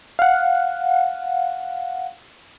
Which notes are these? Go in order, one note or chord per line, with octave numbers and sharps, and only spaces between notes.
F5 F#5